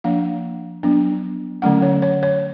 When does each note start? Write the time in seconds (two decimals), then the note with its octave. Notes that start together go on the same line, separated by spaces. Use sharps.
0.04 F3 A#3 D4 F5
0.83 F#3 B3 D4
1.62 D3 F#3 A3 C#4 F#5
1.82 C#5
2.02 C#5
2.23 C#5